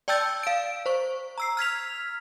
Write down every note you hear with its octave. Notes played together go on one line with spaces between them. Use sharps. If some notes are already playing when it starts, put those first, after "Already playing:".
D5 G5 A5 E6 G6 A6
F5 D7
C5 C#6
A#5 E6 C7
F6 G#6 B6 F7